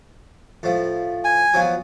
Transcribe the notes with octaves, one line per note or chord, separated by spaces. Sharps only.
A2 F3
G#5
B2 F3 F#3